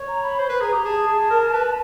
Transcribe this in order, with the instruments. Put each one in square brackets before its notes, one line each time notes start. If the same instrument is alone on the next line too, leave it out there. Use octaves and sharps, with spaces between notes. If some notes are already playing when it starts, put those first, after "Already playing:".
Already playing: [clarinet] C#5
[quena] A#5
B5
[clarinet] C5
B4
[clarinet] G#4 [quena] A#5
[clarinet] G4
[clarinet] G#4 [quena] A5
[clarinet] G#4
A#4
B4